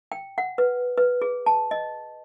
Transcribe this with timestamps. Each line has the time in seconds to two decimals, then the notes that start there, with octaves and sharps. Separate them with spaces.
0.12 G5
0.38 F#5
0.58 B4
0.97 B4
1.22 G#4
1.46 A5
1.71 D#5